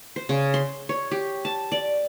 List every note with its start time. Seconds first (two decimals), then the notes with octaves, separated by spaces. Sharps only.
0.16 C5
0.29 C#3
0.54 C6
0.89 C#5
1.11 G4
1.45 A5
1.72 D5